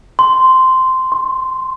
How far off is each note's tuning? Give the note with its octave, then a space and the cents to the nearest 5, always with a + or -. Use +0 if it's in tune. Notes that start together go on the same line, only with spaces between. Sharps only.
C6 -10
C6 +40